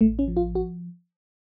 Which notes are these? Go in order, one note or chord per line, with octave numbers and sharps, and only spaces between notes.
A1 A3
C#4
F3
F4
F#4